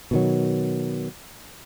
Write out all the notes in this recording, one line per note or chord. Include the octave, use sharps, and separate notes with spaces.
B2 D#3 F#3